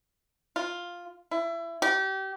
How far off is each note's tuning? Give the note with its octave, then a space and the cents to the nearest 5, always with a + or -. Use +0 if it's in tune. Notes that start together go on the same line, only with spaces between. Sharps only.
F4 +5
E4 +25
G4 -30